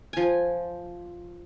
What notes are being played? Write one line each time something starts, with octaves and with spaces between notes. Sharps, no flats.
F3 G#5